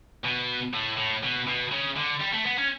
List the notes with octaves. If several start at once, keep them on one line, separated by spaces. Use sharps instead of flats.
B2
A2
A2
B2
B2
C#3
D3
G3
A3
B3
C#4